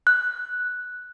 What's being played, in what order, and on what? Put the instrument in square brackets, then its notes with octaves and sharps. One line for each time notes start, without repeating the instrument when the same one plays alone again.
[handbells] F#6